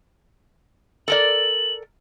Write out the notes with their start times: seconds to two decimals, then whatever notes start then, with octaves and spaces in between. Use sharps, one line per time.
1.08 A4 A#4 D5 F#7